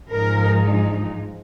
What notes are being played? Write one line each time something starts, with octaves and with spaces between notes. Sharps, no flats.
G#2 F3 G#3 D#4 A#4